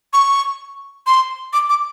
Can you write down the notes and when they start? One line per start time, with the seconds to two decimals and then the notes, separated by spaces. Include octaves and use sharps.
0.13 C#6
1.07 C6
1.53 D6
1.69 D6